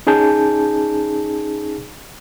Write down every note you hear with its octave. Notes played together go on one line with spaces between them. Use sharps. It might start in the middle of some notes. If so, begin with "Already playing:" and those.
C#4 D#4 G#4 A5 G6